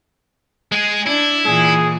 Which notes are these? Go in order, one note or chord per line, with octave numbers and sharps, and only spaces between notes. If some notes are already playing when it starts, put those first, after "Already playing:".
G#3 G#4
D4 E4
A#2 E3 G#4